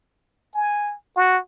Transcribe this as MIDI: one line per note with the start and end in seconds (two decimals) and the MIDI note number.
0.55 0.95 80
1.16 1.39 66